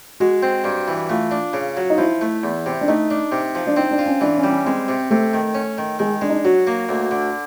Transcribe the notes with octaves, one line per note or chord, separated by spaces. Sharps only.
G#3 F#4
C4
G2
E3
A3 F4
D4
C#3
F#3
D#4
F3 E4
A3
E2
C3
D4
A3 D#4
D4
C3
F3
D4
C4 D#4
D4
F4
C#4
E3 D4
C#4
G3
C#4
G#3 C4
C3
C3 A3
D#3
C#4
D#3
D#3 G#3
G#3 D4
D#4
D4
F#3 F#4
A#3
D2
D3